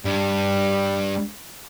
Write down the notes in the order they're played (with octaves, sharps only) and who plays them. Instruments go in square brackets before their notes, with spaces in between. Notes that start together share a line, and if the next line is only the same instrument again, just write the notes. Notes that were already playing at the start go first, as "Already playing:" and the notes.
[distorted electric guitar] G2 [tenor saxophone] G3